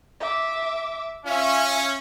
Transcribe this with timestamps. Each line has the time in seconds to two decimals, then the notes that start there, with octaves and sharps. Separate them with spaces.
0.21 E5 D6
1.25 C#4 F4 E5